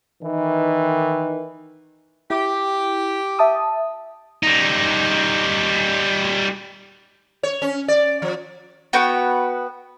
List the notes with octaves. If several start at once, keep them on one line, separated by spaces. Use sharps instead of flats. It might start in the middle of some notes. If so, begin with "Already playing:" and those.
D#3 E3
E4 G4
E5 A5 D#6
G3 D#4
C#5
C#4
D5
F3
B3 F#4 B4 G5